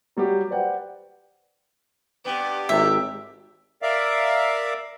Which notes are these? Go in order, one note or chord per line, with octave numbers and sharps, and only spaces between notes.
F#3 G3 F#4 G4
B4 C5 D5 F#5 G5
G2 B3 G4
G#1 A2 E5
A#4 D5 E5 F5